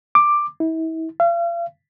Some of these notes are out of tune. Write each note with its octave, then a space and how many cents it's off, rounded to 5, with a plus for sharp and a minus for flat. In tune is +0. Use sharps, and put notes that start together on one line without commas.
D6 +10
E4 -35
F5 -40